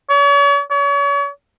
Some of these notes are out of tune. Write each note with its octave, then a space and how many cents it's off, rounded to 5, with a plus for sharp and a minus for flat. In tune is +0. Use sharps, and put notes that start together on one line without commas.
C#5 +40
C#5 +40